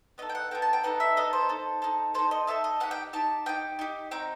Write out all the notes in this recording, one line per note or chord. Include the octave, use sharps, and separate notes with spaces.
B3 D#4 A4 D#5
G5
F#5
B3 D#4 A4 G5
A5
G5
B3 D#4 A4 F#5
E5
B3 D#4 A4 D#5
C5
D#4 A4
D#4 A4
D#4 A4 C5
D#5
D#4 A4 E5
D#5
D#4 G4 F#5
G5
D#4 G4 A5
D#4 G4 G5
D#4 G4
C4 D#4 F#4 G5